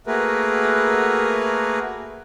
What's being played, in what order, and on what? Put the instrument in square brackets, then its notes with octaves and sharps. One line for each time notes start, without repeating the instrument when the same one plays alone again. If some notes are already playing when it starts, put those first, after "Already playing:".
[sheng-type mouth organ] A3 A#3 F#4 G#4 A#4 B4